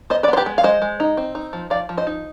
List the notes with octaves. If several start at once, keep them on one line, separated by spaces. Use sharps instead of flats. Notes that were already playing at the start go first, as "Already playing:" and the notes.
B3 C5 D#5
B4 D5
B3
C5
G4 B4
G#3
F5
G#3 C5 D#5
G#3
D#4
C4
D#4
F3
F3 D5 F5
F3
C5 D#5
D#4